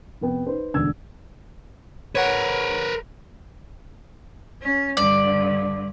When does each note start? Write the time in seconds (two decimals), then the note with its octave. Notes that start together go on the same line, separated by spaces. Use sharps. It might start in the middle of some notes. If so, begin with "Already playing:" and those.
0.21 F2 C3 B3 G5
0.47 D#4 B4 C5
0.74 E1 D2 D3 E6 G#6
2.15 A#4 B4 C#5 F#5
4.62 C#4
4.97 G2 D3 D5